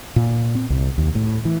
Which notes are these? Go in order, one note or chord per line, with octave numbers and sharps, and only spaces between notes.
A#2
C4
C2
D#2
A2
E3